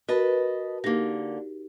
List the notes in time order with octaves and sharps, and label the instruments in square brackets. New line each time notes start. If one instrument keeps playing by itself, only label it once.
[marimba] F#4 A#4 [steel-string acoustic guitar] B4 D#5 A5
[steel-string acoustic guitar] D3 A#3 [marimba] D#4 G4 A#6